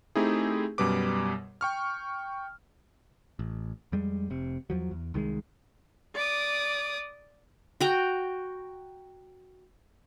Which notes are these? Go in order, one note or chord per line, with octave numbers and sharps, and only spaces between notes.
A3 C4 D#4 E4 G4 G#4
F#2 B2 G3 B4 D6
G5 C#6 F6
A1
F2 G3 G#3
F1 C3
E2 F3 F#3
E2
C2 D#3 F#3 G#3
D5 D6 D#6
F#4 G5 A#5